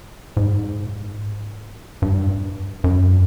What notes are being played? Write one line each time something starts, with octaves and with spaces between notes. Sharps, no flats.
G#2
G2
F#2